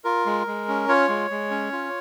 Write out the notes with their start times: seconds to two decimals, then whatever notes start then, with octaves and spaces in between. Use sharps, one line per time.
0.04 F4 A#4
0.26 G#3
0.47 G#3
0.68 C#4
0.88 F4 C#5
1.09 G#3
1.30 G#3
1.51 C#4
1.72 F4